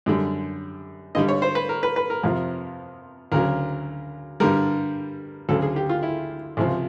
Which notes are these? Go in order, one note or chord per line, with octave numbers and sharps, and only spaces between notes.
F#2 D3 G3
G2 D3 G3 D#5
C#5
C5
B4
A#4
B4
B4
A#4
F2 C3 F3
D2 C#3 F#3 A#4
G2 D3 G3 A#4
D2 C#3 F#3 A4
G#4
G4
F4
E4
C#2 C3 F3